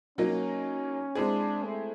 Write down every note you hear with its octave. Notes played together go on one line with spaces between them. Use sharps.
F#3 A#3 C#4 D#4
G#3 C4 D4 E4 G#4
A3